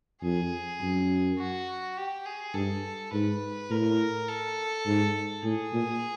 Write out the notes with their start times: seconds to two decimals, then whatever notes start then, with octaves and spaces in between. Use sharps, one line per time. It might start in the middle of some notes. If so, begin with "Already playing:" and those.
0.23 F2 G#4
0.80 F#2
1.39 F#4
1.97 G4
2.26 G#4
2.54 G2 A4
3.13 G#2 B4
3.70 A2 A#4
4.28 A4
4.86 G#2
5.44 A2 G#4
5.73 A#2